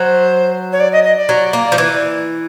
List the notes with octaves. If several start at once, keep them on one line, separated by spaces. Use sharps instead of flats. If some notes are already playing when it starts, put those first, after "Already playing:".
Already playing: F#3 C5
C#5
D5
D#5
D#5
D5
F#3
A#3
F3
E3